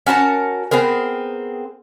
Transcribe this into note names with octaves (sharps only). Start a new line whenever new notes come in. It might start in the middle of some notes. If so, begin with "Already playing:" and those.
C#4 F#4 A#4 A5
B3 C4 G#4 A#4